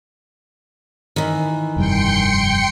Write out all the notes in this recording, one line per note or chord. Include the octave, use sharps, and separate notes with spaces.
D#3 E3
F1 G2 G3 G5 C6 C#7